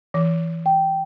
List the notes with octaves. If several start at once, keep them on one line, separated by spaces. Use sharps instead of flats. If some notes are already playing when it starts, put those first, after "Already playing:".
E3
G5